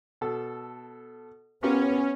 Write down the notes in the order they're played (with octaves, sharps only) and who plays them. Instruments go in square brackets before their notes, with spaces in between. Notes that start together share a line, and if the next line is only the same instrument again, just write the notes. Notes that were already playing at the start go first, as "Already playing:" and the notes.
[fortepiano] B2 A4
[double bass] B3 [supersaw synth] C#4 [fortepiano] F4 G4 A#4